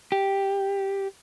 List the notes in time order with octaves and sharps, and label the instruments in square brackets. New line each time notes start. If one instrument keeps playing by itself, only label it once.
[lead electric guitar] G4